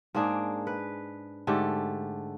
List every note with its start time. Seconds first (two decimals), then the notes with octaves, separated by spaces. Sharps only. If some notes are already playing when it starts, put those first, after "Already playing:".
0.14 G#2 A#3 D4 G#4
0.67 B4
1.47 G#2 D3 A3 G4